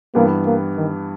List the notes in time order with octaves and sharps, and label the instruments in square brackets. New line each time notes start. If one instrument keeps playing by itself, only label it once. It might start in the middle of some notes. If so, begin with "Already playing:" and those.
[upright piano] G2 E3 G3 B3 G4 [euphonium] A#3
[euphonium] A#3
D#3